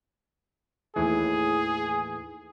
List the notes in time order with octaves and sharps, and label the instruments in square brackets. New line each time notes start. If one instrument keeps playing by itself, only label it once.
[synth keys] D#2 A2 E3 [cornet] G#4